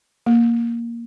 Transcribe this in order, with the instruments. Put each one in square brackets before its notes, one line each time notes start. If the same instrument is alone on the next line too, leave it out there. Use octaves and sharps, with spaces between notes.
[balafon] A#3